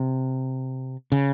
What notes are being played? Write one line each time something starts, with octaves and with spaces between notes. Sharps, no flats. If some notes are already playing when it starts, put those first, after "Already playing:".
Already playing: C3
C#3